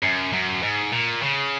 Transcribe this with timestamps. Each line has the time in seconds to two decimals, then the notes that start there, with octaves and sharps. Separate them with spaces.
0.03 F#2
0.33 F#2
0.63 G#2
0.93 A#2
1.23 C#3